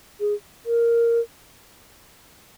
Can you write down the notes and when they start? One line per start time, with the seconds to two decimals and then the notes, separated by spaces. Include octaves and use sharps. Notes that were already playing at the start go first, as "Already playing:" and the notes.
0.20 G#4
0.66 A#4